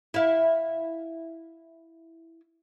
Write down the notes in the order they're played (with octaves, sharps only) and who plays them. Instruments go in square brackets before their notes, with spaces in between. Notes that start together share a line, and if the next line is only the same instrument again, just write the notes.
[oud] E4 F5